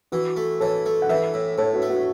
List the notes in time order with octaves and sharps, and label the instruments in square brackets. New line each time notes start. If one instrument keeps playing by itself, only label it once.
[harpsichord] E3 [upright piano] F#4 B4
[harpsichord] A3
[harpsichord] E3 [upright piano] A4 C#5
[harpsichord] A3
[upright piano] F#5
[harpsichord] E3 [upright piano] B4 E5
[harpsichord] A2
[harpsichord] A2 [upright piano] A4 C#5
[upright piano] F#4 B4
[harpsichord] A3
[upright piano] F#4 B4